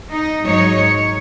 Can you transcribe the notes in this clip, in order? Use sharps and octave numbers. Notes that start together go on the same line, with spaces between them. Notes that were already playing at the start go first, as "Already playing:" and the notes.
D#4
G#2 F#3 D#4 C#5
C#5